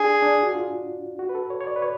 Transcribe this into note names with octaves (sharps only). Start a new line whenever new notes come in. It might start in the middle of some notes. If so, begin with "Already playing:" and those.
Already playing: D4 G#4
D4
F#4
F4
F#4
B4
A4
C#5
C#5
D5
B4
C#5